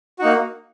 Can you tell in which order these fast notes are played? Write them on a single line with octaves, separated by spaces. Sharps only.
F#4 D#4 A#3